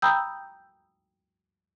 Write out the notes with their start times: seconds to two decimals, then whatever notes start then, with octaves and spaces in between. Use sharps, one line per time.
0.02 G5 A#5 B5 D#6 E6 G6